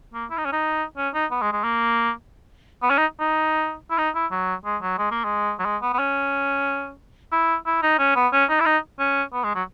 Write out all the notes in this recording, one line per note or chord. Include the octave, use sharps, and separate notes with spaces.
A#3
E4
D#4
C#4
D#4
C#4
D#4
B3
G#3
G#3
A#3
B3
C#4
D#4
D#4
E4
D#4
E4
F#3
G#3
F#3
G#3
A#3
G#3
F#3
G#3
B3
B3
C#4
E4
E4
D#4
C#4
B3
C#4
D#4
E4
D#4
C#4
B3
G#3
F#3